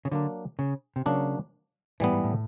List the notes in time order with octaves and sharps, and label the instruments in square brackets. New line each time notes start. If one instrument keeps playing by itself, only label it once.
[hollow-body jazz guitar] C#3
[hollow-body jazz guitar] D3 [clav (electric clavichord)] F#3 A#3 D4
[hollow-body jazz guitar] C#3
C3
[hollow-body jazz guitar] C#3 [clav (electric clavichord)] F#3 A#3 D4
[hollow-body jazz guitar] A2 [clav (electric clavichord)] E3 G3 B3
[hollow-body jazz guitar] G#2
A2